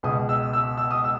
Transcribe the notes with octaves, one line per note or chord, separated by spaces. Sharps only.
C#2 B2 D#6
E6
E6
E6
D#6
E6